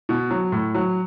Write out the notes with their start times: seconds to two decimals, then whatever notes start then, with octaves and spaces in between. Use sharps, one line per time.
0.09 B2
0.31 F#3
0.52 A2
0.75 F#3